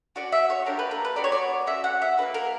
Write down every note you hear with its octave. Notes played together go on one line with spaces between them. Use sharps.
C#4 F#4 D5
E5
C#5
A#3 D4 G4 A#4
B4
A#4
B4
B3 F#4 D5
C#5
D5
C#4 F#4 E5
F#5
E5
A#3 D4 F#4 B4
A#4